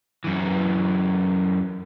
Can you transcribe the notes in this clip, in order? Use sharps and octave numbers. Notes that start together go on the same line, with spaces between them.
F#2 E3